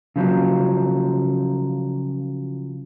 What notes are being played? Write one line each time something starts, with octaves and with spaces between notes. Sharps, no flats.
C#3 F3 F#3